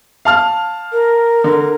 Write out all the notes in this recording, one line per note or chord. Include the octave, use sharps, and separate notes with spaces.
F5 A5 F6
A#4
D3